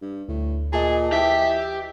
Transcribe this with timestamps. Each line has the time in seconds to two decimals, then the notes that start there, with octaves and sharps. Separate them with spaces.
0.02 G2
0.28 D2 A2
0.73 A#2 G#4 D#5 A5
1.12 E3 G4 E5 G5